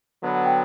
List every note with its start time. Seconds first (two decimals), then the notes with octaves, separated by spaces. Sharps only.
0.22 D3 F#3 B3
0.34 F#5
0.45 G5